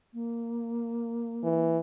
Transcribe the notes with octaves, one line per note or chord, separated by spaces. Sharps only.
A#3
E3